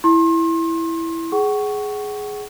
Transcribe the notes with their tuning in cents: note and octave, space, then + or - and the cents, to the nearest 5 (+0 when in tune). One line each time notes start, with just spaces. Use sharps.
E4 +0 C6 +35
G#4 +10 F#5 +35 C#6 +0